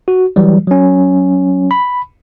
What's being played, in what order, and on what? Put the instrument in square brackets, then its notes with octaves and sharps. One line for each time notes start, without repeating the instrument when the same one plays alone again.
[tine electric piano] F#4
E3 F#3 G3
F#3 C#4
B5